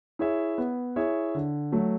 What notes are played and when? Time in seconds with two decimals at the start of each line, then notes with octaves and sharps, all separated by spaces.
0.19 E4 G#4 C#5 E5
0.58 B3
0.96 E4 G#4 C#5 E5
1.35 D3
1.72 F#3 A3